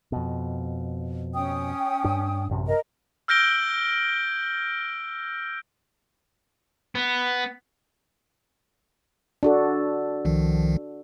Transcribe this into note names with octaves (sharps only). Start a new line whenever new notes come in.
F2 B2
C#4 G5 D#6
G2 D4
A1 F#2 C3
A#4 D#5
E6 F6 G6 A#6 D7 G7
B3
D4 F#4 A4
C2 D#3 F3